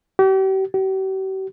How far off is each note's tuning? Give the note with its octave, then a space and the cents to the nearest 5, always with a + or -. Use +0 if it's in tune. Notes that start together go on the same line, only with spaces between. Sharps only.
G4 -40
G4 -45